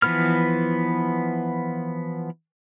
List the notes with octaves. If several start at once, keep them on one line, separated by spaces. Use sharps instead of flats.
E3 F3 B3 B4 F6